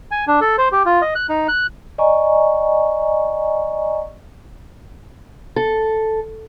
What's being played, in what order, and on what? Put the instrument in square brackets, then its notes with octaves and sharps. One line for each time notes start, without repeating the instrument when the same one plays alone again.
[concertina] G#5
D4
A4
C5
G4
F4
D#5
F#6
D#4
F#6
[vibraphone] D5 D#5 G#5 A#5 C#6
[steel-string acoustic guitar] A4